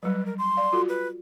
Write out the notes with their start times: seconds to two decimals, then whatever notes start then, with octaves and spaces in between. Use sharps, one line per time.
0.03 F#3 G3 B4
0.26 A#4
0.38 C6
0.57 D5 F5
0.73 F4 F#4 A4
0.89 B4